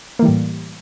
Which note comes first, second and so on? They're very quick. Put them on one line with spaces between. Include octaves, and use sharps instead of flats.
A#3 E3 G3 A2